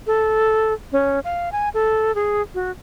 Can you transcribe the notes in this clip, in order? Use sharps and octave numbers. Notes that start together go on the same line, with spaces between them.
A4
C#4
F5
G#5
A4
G#4
F#4